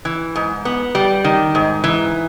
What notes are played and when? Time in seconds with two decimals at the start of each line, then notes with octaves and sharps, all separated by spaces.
0.05 E3
0.36 G#2
0.65 B3
0.95 G3
1.24 D#3
1.55 G#2
1.84 E3